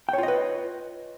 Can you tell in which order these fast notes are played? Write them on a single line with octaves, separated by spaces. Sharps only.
G5 C#5 F4 D#5 B4